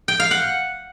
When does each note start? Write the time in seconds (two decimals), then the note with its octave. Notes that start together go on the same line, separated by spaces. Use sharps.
0.08 G5
0.20 F5
0.31 F#5